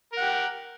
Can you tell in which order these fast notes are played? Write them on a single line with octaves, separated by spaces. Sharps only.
A#4 F#5 G4